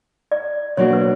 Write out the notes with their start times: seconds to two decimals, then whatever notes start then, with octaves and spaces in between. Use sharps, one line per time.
0.32 D5
0.77 B2 F#3 A#3 D4 F#4 C#5
0.93 B4